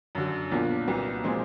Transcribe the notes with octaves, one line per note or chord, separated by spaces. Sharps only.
F#2 D3 F#3
B1 A#2 F3 A#3 D4
C2 A#2 F#3 B3
A#2 F3 G#3 C4